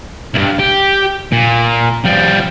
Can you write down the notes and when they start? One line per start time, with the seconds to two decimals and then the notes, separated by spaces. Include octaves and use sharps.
0.34 C#2 G2
0.59 G4
1.33 A#2
2.05 F3 G3